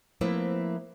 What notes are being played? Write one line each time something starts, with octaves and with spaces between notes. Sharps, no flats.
F3 A3 A#3 C4 E4 B4